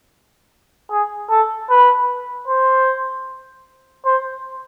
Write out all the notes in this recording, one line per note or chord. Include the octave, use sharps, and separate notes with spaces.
G#4
A4
B4
C5
C5